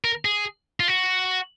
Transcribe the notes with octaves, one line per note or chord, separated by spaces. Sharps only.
A#4
G#4
F4
F#4